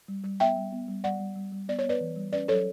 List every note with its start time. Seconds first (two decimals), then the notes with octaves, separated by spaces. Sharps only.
0.08 G3
0.24 G3
0.40 B3 E5 G5
0.56 G3
0.73 B3
0.88 G3
1.04 G3 D5 F#5
1.20 G3
1.36 G3
1.52 G3
1.68 B3 D5
1.79 C#5
1.84 B3
1.89 B4 D5
2.01 E3
2.16 G3
2.33 C#4 B4 D5
2.48 F#3 A4 C#5